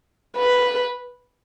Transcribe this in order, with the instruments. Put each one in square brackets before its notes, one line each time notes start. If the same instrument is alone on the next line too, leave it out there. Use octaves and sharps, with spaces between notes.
[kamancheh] B4